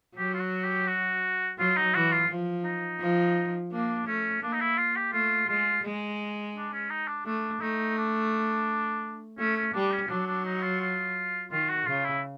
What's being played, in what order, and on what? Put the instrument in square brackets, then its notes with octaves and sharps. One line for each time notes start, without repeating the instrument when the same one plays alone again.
[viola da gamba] F#3 [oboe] G4
[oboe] F4
F#4
G4
F#4
[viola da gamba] F#3 [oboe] F4
[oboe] D#4
[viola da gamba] E3 [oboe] F#4
[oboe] F4
[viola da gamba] F3
[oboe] D#4
[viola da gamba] F3
[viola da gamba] A#3 [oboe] D4
[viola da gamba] A3 [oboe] C#4
[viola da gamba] A#3 [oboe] D4
[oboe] D#4
E4
F4
G4
[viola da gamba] A3 [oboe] F4
[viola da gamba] G#3 [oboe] F4
[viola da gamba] G#3
[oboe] D4
C#4
D#4
D4
[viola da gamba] A3 [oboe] D4
[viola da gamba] A3 [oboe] D#4
[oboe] D4
[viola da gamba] A3 [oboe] C#4
[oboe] C#4
[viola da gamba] G3 [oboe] D4
[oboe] C#4
[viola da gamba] F#3 [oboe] D4
[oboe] D4
D#4
F4
F4
[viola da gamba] D#3 [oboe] F4
[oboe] F#4
[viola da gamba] C#3 [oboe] F4
[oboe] E4